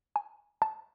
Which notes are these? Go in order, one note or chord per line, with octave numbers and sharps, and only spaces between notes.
G#5
A5